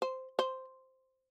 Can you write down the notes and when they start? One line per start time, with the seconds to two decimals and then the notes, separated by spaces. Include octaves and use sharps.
0.02 C5
0.39 C5